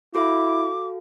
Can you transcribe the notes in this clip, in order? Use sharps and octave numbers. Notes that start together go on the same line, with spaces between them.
E4 F#4 A4 F5 D6